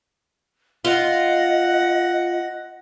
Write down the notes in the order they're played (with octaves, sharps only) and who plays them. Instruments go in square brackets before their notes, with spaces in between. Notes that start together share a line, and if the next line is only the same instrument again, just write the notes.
[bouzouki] F4 [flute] D#5 [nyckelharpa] F#5